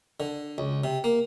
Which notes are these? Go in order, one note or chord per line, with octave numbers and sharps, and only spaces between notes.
D3
C#2
C3
A#3